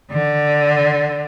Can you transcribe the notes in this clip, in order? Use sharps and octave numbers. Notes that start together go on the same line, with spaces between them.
D3